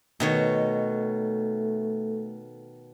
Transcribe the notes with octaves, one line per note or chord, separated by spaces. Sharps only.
B2 D#3 A3 C#5